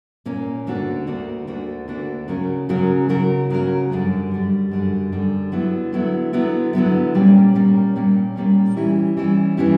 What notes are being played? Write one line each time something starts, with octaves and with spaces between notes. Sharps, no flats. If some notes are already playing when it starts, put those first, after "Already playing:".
A#2 A#3 C#4
D2 D3 A#3 D4 F#4
D2 D3 A#3 D4 F#4
D2 D3 A#3 D4 F#4
D2 D3 A#3 D4 F#4
C#3 F#3 C#4 F#4 A#4
C#3 F#3 C#4 F#4 A#4
C#3 F#3 C#4 F#4 A#4
C#3 F#3 C#4 F#4 A#4
F#2 D3 G3
F#2 D3 G3
F#2 D3 G3
F#2 D3 G3
D3 F#3 B3 E4
D3 F#3 B3 E4
D3 F#3 B3 E4
D3 F#3 B3 E4
A#2 G3 A#3 C#4
A#2 G3 A#3 C#4
A#2 G3 A#3 C#4
A#2 G3 A#3 C#4
E3 G3 C#4 E4 G4
E3 G3 C#4 E4 G4
E3 G3 C#4 E4 G4